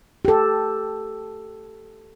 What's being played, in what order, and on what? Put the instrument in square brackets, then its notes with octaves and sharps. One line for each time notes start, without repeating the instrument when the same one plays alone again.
[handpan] G4 A4